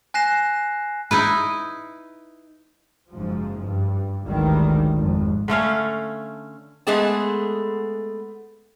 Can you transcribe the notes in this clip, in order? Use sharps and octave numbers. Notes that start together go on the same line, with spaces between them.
G#5 F#6 A#6 C7 E7
D#4 E4 B4
F#1 G#2 F3
G2
G#1 D2 D#3 E3 F#3 G3
G#1 F2
D3 A3 C#4 F5
G#3 A3 B3 G#4 G#5 A5